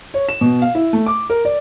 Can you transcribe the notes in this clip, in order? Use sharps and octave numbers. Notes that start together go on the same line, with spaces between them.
C#5
E7
B2
F5
E4
A3
D6
A#4
D5